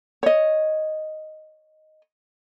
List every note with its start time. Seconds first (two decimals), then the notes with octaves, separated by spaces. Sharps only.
0.23 C#5 D#5